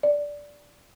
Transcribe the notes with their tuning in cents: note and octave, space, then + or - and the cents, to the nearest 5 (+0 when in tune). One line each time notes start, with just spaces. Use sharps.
D5 -10